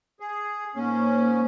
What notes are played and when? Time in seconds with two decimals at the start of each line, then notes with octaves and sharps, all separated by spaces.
0.20 G#4
0.75 G#2 A#3 C#4